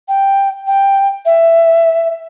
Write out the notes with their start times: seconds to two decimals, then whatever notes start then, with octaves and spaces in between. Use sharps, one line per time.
0.08 G5
0.67 G5
1.26 E5